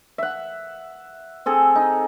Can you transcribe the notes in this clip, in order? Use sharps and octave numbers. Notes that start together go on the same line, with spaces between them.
E5 F#5
C4 G#4 A4
D#4